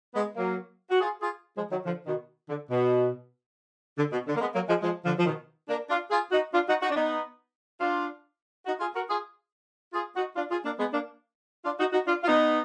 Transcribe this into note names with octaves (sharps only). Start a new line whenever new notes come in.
G#3 B3
F#3 A#3
F#4
F4 G#4
F4 G#4
F3 G#3
D#3 F#3
D3 F3
B2 D#3
D3
B2
D3
B2
D3
A#3
G#3 B3
F#3 A#3
F3 G#3
F3 G#3
D3 F3
F3
B2 D#3
A#3 D4
D4 F4
F4 G#4
D#4 F#4
D4 F4
D#4 F#4
D#4 F#4
D4
B3 D#4
D4 F4
D#4 F#4
F4 G#4
F#4 A#4
F4 G#4
F4 G#4
D#4 F#4
D4 F4
F4 G#4
A#3 D4
G#3 B3
A#3 D4
D4 F4
D#4 F#4
D#4 F#4
D4 F4
F4
B3 D#4